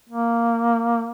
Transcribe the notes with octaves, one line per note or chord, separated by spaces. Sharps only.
A#3